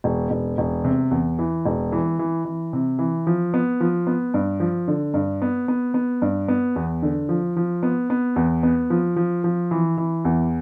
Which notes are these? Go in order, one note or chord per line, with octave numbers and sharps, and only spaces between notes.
E1
E1
E1
C3
E2
E3
E1
E3
E3
E3
C3
E3
F3
B3
F3
B3
G2
F3
D3
G2
B3
B3
B3
G2
B3
E2
D3
F3
F3
B3
B3
E2
B3
F3
F3
F3
E3
E3
E2